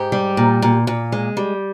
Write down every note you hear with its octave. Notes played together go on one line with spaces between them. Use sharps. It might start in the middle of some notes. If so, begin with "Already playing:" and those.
Already playing: G#2 G4
G3
A#2
A#2
A#2
G#3
G3